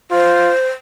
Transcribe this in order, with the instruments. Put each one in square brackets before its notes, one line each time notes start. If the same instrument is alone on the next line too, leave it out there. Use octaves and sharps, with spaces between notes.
[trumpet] F4 [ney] C5